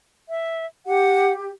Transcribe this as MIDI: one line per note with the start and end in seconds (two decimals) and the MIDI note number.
0.29 0.66 76
0.86 1.49 67
0.86 1.32 78